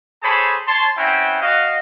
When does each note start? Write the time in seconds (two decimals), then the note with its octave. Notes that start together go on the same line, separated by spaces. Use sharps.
0.23 G#4 A4 C5 C#5 A5 B5
0.68 C#5 A5 C6
0.98 C4 C#4 E4 F#5 G5
1.42 F#4 D#5 F5